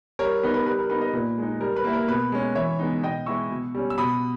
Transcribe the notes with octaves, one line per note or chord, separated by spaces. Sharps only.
G3 A#4 C#5
B3 D#4 B4
B4
G3 B4
A#4
B3 D#4 B4
B4 D#5
A#2 B4
G#3 D#4
G3 A#4
B4
A#3 E4
A#4
B2 B4
G#3 C#4
E3 C#5 E5
G#3 B3 D#4
B2 D#5 G5
G#3 B3 E4 C#6 E6
B2
G3 C#4
E6
B2 B5 D#6